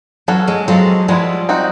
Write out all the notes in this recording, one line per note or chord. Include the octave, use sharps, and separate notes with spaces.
E3 F#3 C#4 F#4 A4
F#3 G#3
F#3 G#3 C4 F4 A4
F3 G3 G#3 B3 E4
C4 D#4 F#4